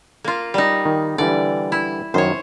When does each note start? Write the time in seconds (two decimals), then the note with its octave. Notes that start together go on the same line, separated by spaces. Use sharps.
0.24 A#3 F4
0.54 G3 D#4
0.85 D#3
1.18 D3 E3 G3 D5
1.72 E4
2.14 F#2 D#3 C5 C#5